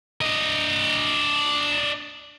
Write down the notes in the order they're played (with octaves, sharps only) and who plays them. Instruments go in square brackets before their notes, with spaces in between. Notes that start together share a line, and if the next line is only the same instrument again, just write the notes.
[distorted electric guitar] D4 D#5